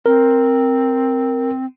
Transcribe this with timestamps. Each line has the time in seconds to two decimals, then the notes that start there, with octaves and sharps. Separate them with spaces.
0.06 C4 A#4